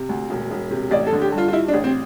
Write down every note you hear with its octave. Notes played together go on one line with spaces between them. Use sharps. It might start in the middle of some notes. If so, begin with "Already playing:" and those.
Already playing: C3
D2
E1
E1
C3
A1 D5
A4
D3
G4
G2
F4
F4
G3 E4
D4
A1
C4